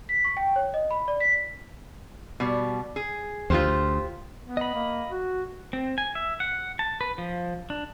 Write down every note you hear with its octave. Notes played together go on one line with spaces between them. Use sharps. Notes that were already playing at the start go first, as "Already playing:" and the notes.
B6
C#6
G5
C#5
D#5
B5
D5
B6
B2 G3
G#4
D2 F4 G4 C5
B3
D#5 B5
A#3
F#4
C4
G#5
E5
F#5
A5
B4
F3
D4